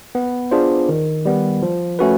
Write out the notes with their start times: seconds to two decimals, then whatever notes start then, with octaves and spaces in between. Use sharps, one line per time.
0.15 B3
0.51 D4 F4 G#4 C5
0.89 D#3
1.25 G3 B3
1.62 F3
1.99 A3 C#4 F#4 B4